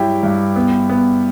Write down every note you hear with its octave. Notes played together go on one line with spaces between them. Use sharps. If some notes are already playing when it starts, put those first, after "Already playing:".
Already playing: G2 F#3 E4 G4
G2
B3
B3